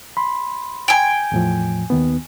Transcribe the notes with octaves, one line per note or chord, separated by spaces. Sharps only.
B5 C6
G5 G#5
E2 A2 F3
D#2 D#3 B3